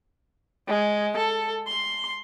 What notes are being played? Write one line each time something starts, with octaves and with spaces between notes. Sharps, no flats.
G#3
A4
C6